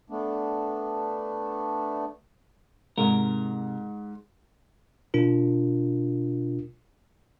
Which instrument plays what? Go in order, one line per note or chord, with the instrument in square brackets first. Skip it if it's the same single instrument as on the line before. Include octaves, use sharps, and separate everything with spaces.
[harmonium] A3 B3 D4
[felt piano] G#2 [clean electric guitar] C3 A#4
[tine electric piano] B2 D4 F4 A#4